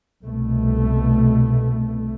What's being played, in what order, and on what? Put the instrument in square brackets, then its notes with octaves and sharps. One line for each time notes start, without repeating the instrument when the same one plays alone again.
[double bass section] C2 B2 A3